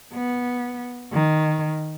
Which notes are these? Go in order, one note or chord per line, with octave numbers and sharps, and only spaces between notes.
B3
D#3